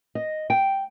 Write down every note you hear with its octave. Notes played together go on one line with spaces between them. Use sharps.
D#5
G5